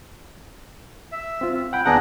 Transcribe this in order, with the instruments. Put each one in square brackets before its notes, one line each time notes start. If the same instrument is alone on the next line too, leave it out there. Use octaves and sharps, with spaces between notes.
[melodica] E5
[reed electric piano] C4 F4
[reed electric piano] F#5 B5 [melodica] G5
[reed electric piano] D#2 B3 F#5 [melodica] D4 G#4 A#5